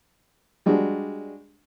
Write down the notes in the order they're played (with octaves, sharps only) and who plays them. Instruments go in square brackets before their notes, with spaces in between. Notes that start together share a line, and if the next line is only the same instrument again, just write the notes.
[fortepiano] G3 G#3 D4 F#4